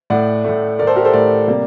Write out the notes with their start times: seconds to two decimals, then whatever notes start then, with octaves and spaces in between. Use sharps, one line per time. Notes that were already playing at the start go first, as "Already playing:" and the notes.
0.10 A2 A3 D5 F#5
0.44 A2 A3
0.79 A3 A#4 D5
0.83 A2 A4 C5
0.96 G4 A#4
1.05 A4 C5
1.13 A2 A3 A#4 D5
1.47 C3 G3 A#3